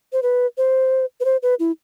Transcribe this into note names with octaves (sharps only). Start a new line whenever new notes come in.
C5
B4
C5
B4
C5
B4
E4